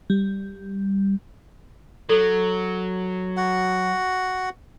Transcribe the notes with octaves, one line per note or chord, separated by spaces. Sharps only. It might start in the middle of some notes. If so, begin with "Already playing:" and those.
G3
F#3 A4
F#4 F#5